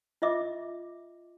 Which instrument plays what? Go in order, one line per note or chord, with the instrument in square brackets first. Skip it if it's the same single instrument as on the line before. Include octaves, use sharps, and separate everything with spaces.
[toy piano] F4 D#5 E5 D6